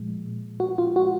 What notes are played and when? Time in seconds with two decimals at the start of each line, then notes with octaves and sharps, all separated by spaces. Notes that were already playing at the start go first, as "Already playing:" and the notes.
Already playing: A#2 F3 G#3
0.60 F#4
0.78 F4
0.96 F#4